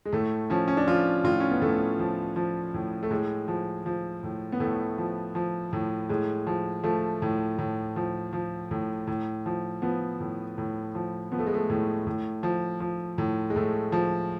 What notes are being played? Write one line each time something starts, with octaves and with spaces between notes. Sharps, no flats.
G#3
A2 A3
F3 C#4
C#4
D4
F3 F4
A2 F4
C#4
B3
A2 A3
F3
F3
A2
A3
A2 G#3
F3
F3
A2
B3
A2 A3
F3
F3
A2
A2 G#3
F3
F3 A3
A2
A2
F3
F3
A2
A2
F3
F3 B3
A2
A2
F3
F3 B3
A3
G#3
A3
A2
A2
F3
F3
A2
G#3
A2 A3
F3